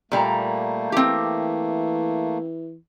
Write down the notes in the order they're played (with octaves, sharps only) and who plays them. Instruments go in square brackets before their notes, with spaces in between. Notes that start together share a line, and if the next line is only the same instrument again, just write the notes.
[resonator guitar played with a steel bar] A#2 G3 A#5 [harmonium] A3 A#3
[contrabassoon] E3 [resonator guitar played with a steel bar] C4 G4